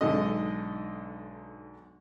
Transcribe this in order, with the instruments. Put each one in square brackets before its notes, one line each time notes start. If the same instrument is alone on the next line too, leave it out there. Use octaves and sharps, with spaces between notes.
[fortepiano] B1 G#2 D3 D#5